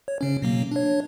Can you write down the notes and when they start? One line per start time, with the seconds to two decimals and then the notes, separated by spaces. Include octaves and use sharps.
0.08 C#5
0.21 C#3 C#4
0.42 B2 F#3 A#3
0.71 D4 C#5